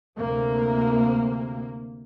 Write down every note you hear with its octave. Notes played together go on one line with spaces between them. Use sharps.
D2 C3 A#3